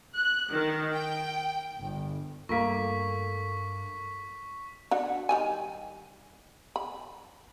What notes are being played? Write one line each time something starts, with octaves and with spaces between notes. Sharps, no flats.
F#6
D#3
G5
G1
G2 A3 A#3 F4 A4 F5 C#6 B6
D4 F#4 F#5
D#3 G3 G#5
B5